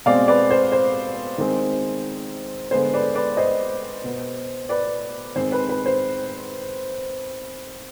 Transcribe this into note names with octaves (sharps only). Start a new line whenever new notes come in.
B2 G#3 C4 D5 F5
B4 D5
C5
C5
D#3 G#3 C4
D3 G#3 B3 C5
B4 D5
B4 D5
C5 D#5
B2 B3
B4 D5
D#3 G#3 C4 C5
B4
B4
C5